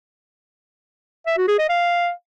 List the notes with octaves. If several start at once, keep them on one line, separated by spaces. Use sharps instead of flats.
E5
F#4
G#4
D#5
F5